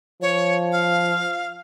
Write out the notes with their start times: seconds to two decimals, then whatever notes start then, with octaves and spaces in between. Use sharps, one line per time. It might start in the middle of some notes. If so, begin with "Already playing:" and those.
0.22 F3 C#5
0.72 F5